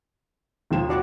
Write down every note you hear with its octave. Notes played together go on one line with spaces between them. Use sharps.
D#2 F3 E7
F#4 D5 F#5